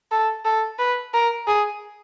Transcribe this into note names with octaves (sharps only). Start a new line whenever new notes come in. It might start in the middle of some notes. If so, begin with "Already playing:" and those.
A4
A4
B4
A#4
G#4